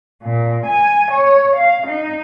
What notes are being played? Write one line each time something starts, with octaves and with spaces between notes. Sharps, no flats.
A#2
G#5
C#5
F5
D#4